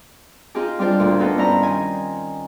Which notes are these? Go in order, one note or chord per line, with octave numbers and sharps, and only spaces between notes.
C4 D#4 F4 G4 G#4
G3 C4 D4 F4 G4 C5
D2 A#2
B3 C4 D#4 F4 A4 F#5
G2 C4 C#4 E4 C5 A#5
D#3 D#4 G#5